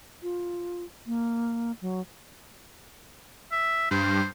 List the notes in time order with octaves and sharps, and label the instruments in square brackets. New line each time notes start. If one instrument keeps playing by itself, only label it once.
[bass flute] F4
A#3
F#3
[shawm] E5
[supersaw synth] G2 [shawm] C5